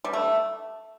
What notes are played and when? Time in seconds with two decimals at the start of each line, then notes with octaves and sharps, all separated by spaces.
0.04 G3
0.13 A3